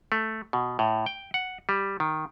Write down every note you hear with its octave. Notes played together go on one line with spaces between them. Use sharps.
A3
B2
A2
G5
F#5
G3
D#3